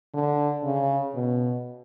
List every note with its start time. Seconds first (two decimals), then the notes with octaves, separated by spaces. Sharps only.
0.14 D3
0.64 C#3
1.15 B2